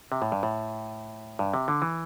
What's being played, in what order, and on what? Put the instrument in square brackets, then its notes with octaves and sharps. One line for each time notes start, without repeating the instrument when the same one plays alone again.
[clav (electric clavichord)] C3
A2
G2
A2
G2
C3
D3
E3